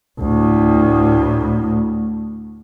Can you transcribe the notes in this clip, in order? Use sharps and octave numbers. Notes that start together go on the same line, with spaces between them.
D2 A2